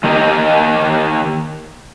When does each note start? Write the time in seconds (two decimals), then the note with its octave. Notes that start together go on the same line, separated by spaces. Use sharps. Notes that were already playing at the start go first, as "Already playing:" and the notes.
0.04 D#3 A#3 G4 A#4 D#5